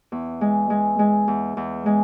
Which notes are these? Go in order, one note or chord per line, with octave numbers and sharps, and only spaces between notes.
E2
G#3
G#3
G#3
E2
E2
G#3